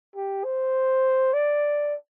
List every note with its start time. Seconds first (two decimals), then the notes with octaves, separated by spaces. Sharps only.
0.16 G4
0.44 C5
1.34 D5